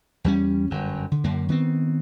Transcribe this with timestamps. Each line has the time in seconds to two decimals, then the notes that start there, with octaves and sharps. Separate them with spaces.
0.24 E2 G3 C#4
0.70 G1 F#2
1.11 D3
1.24 F#2 D3 A#3
1.49 D#3 B3 C4